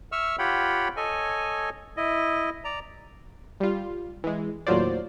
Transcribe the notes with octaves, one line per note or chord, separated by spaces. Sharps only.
E5 C#6 E6 F6
F4 G4 C#5 F#5 G5 B5
A4 C#5 D#5 G#5
E4 D#5
D5 A#5
G3 F4
E3 G#3
D#2 A2 F#3 F4 C5 D5